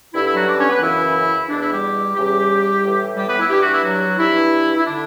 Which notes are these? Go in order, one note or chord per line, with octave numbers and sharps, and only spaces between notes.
G2 D3 E4
E4
F#3 F#4
D4 D5
C#4 C#5
B3 B4
F#2 C#3 E3 E4
E2 B2 D4
E4
G3 G4
E2 C#3 E3 G3 G4
A2 E3
G3 G4
B3 B4
E4
G2 E3 G4
F#4
E4
F#3 F#4
G2 E3 E4
E4
D3 D4